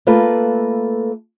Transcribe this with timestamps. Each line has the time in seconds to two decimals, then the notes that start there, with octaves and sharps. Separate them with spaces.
0.07 A3 A#3 F4 A4 B4